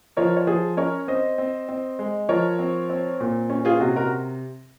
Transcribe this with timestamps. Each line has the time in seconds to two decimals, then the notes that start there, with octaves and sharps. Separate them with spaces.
0.17 F3 A#4 C#5
0.37 C#5
0.47 F3 G#4 C5
0.77 C#4 A#4 C#5
1.08 C4 C5 D#5
1.38 C4
1.69 C4
1.99 G#3
2.29 F3 A#4 C#5
2.59 C4
2.90 C4
3.20 A#2
3.50 C#4
3.65 F4 G#4
3.80 C3 F#4
3.96 F#4 A#4